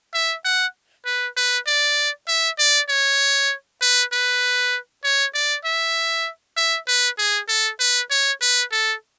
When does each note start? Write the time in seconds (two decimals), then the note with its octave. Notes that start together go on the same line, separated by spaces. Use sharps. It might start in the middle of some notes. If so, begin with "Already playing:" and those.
0.14 E5
0.45 F#5
1.06 B4
1.37 B4
1.67 D5
2.28 E5
2.59 D5
2.89 C#5
3.81 B4
4.13 B4
5.04 C#5
5.34 D5
5.65 E5
6.57 E5
6.87 B4
7.18 G#4
7.49 A4
7.80 B4
8.11 C#5
8.41 B4
8.72 A4